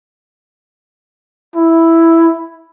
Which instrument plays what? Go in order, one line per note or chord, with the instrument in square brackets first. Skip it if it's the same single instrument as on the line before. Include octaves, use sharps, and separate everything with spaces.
[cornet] E4